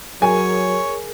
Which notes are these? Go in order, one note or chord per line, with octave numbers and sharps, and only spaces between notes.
F#3 G#4 A#4 C#5 G#5